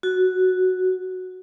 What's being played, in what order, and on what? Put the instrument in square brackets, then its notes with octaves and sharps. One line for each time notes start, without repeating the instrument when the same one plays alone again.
[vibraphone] F#4